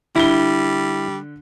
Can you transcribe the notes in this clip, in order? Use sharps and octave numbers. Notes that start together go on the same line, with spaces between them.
D3 G3 E4 G7